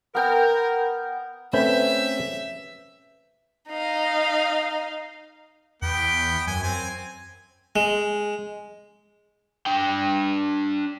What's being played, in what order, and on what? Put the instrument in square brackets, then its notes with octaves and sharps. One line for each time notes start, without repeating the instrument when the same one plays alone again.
[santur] B3 G5 [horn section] A#4
[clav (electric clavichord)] A3 C4 C#4 [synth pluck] B4 G6 [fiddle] E5
[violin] D#4 F5
[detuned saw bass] E2 [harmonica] B3 G5
[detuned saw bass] F#2 [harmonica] G#5
[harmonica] C4 G#5
[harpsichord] G#3
[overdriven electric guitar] D4 G5